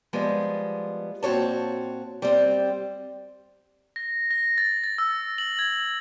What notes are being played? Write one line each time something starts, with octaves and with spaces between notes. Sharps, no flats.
F3 G3 G#3 B3
A#2 C4 F#4 C#5 A5
G3 C4
A#6
A#6
A6
A6
E6
F#7
G#6